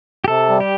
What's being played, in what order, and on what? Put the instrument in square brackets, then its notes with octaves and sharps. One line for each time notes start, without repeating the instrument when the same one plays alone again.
[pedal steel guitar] G4
[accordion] C3 [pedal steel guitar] A4
[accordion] G3
[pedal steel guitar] G4